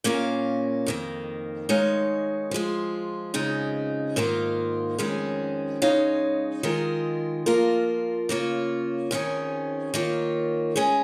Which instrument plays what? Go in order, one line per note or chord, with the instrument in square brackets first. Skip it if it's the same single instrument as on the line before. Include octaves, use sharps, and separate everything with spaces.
[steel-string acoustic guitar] A#2 A#3 C#4 A#4 F5
F2 D#3 A#3
D#3 G#3 D#4 C#5 F5
F3 G#3 F4
F2 C#3 G#3 D#4
G#2 D#3 A#3 F4
F2 D#3 G#3 C#4
C#3 G#3 D#4 C#5 F5
D#3 G#3 F4 A#4
F3 A#3 F4 A#4
C#3 A#3 F4 C#5
F2 D#3 C#4 G#4 C#5
D#3 A#3 F4 C#5
G#3 C#4 G#4